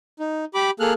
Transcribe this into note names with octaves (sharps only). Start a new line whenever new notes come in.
D#4
G4 B5 D6
A#3 G#4 A4 F6 F#6